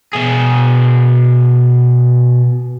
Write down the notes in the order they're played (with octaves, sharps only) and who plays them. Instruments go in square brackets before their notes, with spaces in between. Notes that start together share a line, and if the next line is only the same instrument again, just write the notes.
[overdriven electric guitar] B2 G#4